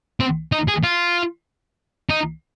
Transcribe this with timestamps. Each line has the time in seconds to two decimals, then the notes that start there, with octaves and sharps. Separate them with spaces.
0.20 C4
0.52 D#4
0.68 G#4
0.83 F4
2.10 D#4